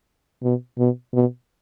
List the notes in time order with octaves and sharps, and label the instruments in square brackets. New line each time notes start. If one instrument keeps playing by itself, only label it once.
[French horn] B2
B2
B2